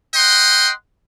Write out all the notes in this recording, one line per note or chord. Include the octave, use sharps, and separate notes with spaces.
D#5 F#5 G5 C6